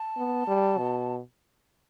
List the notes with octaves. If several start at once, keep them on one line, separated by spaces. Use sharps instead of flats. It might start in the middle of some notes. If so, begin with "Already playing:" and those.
Already playing: A5
B3
G3
B2